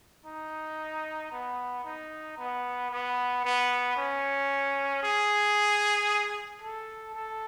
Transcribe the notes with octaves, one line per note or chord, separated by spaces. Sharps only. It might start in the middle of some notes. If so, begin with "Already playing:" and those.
D#4
B3
D#4
B3
B3
B3
C#4
G#4
A4
A4